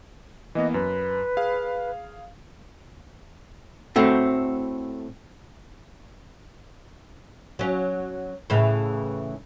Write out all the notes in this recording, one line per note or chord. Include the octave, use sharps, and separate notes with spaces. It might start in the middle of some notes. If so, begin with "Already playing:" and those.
E3 A#3 B3 D#5
F#2 B4
G#4 F5
A2 A3 C4 F#4
F#3 C#4
A2 C#3 E3